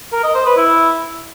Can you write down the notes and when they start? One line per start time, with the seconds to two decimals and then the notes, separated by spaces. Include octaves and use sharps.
0.13 A#4
0.24 D#5
0.35 C5
0.46 B4
0.57 E4